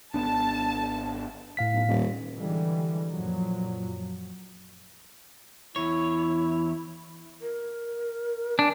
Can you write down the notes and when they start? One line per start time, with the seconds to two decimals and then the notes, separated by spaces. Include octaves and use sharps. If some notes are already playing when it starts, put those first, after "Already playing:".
0.14 G#1 B3 D4 A5
1.57 A2 F5 B6
1.73 B1
1.89 D#1
2.36 D3 E3 G3 G#3
3.11 F#2 A#2 F3 F#3
5.76 E2 E4 C#5
7.42 A#4
8.59 D4 G#5